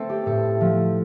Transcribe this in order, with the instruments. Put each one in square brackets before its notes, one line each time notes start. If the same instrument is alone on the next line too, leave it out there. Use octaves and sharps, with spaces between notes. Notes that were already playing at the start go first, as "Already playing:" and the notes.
Already playing: [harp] A3 C4 A4 C5
G4
A2 A4
F3 A3